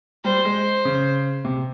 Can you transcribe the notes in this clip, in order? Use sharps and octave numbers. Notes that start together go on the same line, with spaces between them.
G3 C5
G#3
C#3
C3